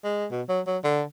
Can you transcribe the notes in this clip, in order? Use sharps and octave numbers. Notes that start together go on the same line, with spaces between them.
G#3
B2
F#3
F#3
D3